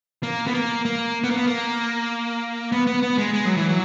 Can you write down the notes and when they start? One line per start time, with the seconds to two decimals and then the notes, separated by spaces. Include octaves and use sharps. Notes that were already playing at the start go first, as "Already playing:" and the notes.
0.23 A#3
0.47 B3
0.54 A#3
0.85 A#3
1.24 B3
1.31 A#3
1.37 B3
1.47 A#3
2.72 B3
2.87 B3
3.03 B3
3.18 G#3
3.34 G#3
3.46 F#3
3.57 E3
3.69 F#3